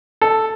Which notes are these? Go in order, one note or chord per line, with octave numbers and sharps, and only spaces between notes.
A4